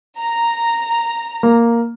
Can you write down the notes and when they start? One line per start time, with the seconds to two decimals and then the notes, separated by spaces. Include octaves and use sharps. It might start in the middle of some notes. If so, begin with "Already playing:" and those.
0.20 A#5
1.43 A#3